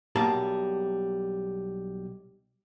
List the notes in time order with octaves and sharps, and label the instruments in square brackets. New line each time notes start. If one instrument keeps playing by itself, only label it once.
[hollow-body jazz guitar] B1 G3 A#3 G#4 D5 A5